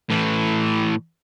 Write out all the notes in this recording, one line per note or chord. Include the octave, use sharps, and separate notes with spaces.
A2 E3